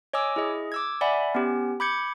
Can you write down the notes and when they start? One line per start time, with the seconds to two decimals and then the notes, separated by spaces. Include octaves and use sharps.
0.13 C#5 D#5 G#5 D6 E6
0.36 E4 G#4 D#5
0.72 D6 E6 G#6
1.01 D5 E5 F#5 G#5 B5
1.35 B3 C#4 G4
1.80 B5 D6 G6 G#6 C#7